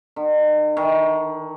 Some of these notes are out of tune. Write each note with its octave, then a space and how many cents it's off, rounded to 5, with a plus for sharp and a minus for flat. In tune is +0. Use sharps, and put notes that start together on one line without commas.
D#3 -40
D#3 +35